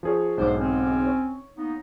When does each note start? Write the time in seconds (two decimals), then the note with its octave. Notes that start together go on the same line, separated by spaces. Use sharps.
0.03 F3 G#4 C#5
0.37 B1 G#2 D4 C5 D6
0.59 C4 C#4
1.07 C#5
1.57 A#3 B3 D#4